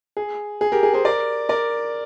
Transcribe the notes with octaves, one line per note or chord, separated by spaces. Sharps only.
G#4
G#4
G4 A#4
G#4
G#4 C5
A#4 D5
A#4 D5